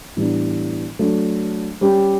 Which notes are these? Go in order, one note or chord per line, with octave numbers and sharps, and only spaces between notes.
A2 E3 G3 B3 D4
F#3 A3 D4
G3 C#4 G4